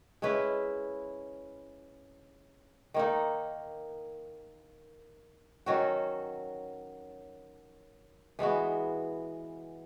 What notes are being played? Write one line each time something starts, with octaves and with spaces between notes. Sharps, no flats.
G#3 C#4 E4 B4
D#3 A#3 D#4
D#3 F#3 C#4 F#4
E3 G#3 B3 F#4